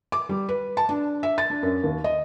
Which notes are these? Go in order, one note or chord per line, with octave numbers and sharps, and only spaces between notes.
D6
G3
B4
A5
D4
E5
A6
D4
F#2
D#2
D#5